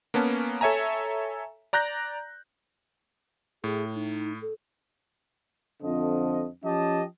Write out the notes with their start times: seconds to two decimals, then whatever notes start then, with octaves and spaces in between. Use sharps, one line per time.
0.14 A#3 B3 C#4 A5
0.61 A4 C#5 E5 G#5 A#5
1.73 D5 A#5 F#6 G6 A#6
3.64 A2 G#4
3.95 D#4
4.42 A4
5.82 F2 D3 F3 D#5
6.64 F3 C#4 G4 D#5 A5